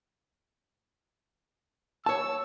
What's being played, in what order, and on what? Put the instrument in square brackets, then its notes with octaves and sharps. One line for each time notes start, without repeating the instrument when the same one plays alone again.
[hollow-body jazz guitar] C#5 A5 [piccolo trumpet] E6